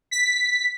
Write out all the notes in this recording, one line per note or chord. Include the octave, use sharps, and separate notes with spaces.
B6